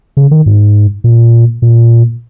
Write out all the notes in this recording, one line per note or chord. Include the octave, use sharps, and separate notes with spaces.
C#3
D#3
G#2
A#2
A#2